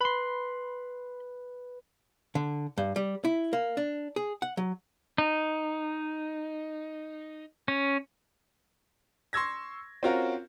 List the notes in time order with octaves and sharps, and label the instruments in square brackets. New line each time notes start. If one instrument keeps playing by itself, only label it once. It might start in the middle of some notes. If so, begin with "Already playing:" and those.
[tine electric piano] B4 [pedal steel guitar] B5 C6
[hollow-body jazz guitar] D3
G2
G3
E4
A#3
D4
G#4
F#5
F#3
[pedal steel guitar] D#4
C#4
[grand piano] C6 C#6 E6 G#6 A#6
C4 C#4 F4 F#4 A#4